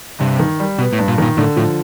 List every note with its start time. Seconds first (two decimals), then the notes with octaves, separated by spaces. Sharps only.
0.20 G2 C3
0.39 D#3
0.60 G3
0.79 B2 B3
0.93 A2
0.99 G2
1.08 A#2
1.18 A#2 D#3
1.37 A2 D3
1.56 A2 F3